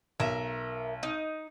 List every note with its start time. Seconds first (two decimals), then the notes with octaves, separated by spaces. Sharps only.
0.20 B1 A#4 E5
1.03 D#4